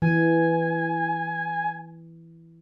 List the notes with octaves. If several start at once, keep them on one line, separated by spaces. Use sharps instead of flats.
E3 G#5